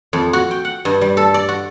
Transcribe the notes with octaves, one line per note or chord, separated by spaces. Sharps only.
F2
F#4
G5
F#5
G2
G3
A4
D5
F#4